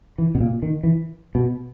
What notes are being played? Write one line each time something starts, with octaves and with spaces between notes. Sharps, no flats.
E3
B2
A#2
D#3
E3
B2